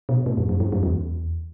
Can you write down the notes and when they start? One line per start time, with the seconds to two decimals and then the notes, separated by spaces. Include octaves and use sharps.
0.09 B2
0.26 A2
0.37 F#2
0.49 F#2
0.60 G2
0.72 F#2
0.83 E2